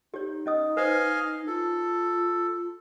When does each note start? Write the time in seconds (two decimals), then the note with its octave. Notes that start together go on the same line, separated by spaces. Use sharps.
0.14 D#4 G4 C#5
0.46 C#4 D#5 D#6
0.77 B4 C5 D#5 F5 G#5 D#6
1.47 F4 A4